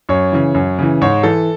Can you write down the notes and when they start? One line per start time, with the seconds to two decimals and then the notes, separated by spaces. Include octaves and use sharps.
0.09 F#2 C#5
0.32 C#3 E3
0.54 F#2
0.79 C#3 E3
1.01 G#2 C#5
1.23 E3 A4